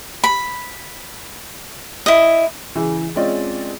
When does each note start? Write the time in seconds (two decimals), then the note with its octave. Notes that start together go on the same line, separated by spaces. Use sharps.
0.24 B5
2.06 E4 D#5
2.75 C#3 E3
3.16 G#3 C4 C#4 F4 D5 D#5